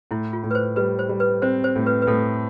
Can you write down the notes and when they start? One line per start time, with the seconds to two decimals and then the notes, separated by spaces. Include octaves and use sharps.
0.11 A2 E4
0.33 F4
0.44 A2
0.51 B4
0.55 C5
0.76 G3 B4
0.99 C5
1.09 G3
1.20 B4
1.42 C4 C5
1.64 C5
1.76 A2
1.86 B4
2.02 B4
2.07 A2 A4